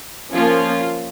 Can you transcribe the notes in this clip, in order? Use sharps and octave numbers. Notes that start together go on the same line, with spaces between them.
F3 A#3 C#4 F4